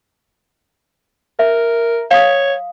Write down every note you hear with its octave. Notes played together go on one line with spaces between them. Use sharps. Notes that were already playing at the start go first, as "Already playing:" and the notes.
A#4 E5
C#5 F5 D#6